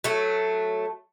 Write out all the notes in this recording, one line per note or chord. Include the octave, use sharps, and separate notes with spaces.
F#3 A3